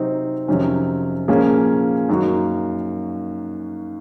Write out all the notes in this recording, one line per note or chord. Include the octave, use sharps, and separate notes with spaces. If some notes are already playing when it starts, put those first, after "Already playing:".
Already playing: C3 F#3 C4 D#4
F2 C3 D#3 F#3 C#4
A#2 F3 A#3 C#4 G#4
F#2 D#3 A#3 D#4 F#4